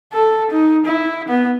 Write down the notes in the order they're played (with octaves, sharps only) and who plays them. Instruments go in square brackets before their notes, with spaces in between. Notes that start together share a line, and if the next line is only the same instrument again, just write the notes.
[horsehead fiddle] A4
D#4
E4
B3